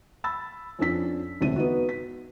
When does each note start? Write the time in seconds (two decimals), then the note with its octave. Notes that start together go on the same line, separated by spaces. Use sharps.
0.24 B5 E6 A6
0.79 F2 C#4 D4 E6 B6
1.41 E1 D2 C3 D4 D#7
1.56 B3 D#4 F#4
1.89 B6